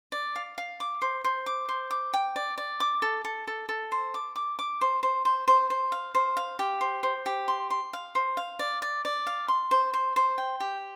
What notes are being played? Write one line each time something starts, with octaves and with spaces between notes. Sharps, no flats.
D5
F5
F5
D6
C5
C5
D6
C5
D6
G5
D5
D5
D6
A4
A4
A4
A4
C5
D6
D6
D6
C5
C5
C5
C5
C5
F5
C5
F5
G4
C5
C5
G4
C6
C6
F5
C5
F5
D5
D5
D5
F5
C6
C5
C5
C5
G5
G4